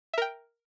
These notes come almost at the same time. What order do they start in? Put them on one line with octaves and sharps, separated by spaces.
E5 A#4 G5